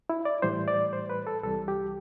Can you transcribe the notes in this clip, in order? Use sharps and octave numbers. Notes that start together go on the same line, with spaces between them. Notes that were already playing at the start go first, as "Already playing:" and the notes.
E4
D5
A2 E3 G3 C5
D5
C5
B4
A4
C2 C3 E3 G3 A4
G4